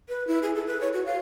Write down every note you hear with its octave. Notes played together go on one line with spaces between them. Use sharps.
B4
E4
G#4
A4
B4
C#5
F#4
F5